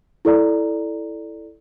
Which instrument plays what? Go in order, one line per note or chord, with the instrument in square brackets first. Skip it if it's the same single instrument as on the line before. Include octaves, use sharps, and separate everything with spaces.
[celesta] E4 A4 D5 A#5